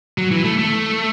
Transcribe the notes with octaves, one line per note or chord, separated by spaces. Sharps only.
F#3
E3
A3
A3